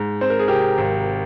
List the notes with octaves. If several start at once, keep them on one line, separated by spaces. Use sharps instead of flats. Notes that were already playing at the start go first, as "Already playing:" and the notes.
Already playing: G#2
C4 C5
A#4
G#4
C3 G4 A#4
G#1